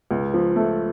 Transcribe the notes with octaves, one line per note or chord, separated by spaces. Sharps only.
C#2
F3
A3